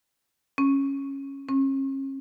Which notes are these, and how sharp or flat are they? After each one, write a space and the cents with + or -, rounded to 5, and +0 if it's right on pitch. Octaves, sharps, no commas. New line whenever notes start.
C#4 -10
C#4 -40